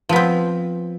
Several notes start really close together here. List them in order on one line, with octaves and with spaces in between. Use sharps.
F3 B3 C4